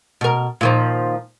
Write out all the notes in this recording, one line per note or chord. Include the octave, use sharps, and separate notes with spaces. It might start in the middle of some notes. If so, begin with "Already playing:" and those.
B2 A#4
A#2 D#3 F3